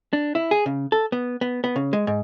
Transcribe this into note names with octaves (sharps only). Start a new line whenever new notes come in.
D4
E4
G#4
C#3
A4
B3
B3
B3
C#3
G#3
G#2